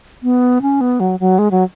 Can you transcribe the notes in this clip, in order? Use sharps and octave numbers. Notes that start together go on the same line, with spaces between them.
B3
C#4
B3
F#3
F#3
G#3
F#3